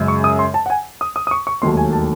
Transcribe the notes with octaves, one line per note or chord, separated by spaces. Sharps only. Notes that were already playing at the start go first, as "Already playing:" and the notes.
Already playing: F#2 C#3 G#3
C#6
D#6
C6
A5
F#5
G#5
D#6
D#6
D#6
C#6
C#6
E1 D#2 D#3 F#3 A3 C6
G#5
A5